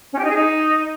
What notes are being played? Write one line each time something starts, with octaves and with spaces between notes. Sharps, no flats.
C#4
G4
D#4
G#4
D#4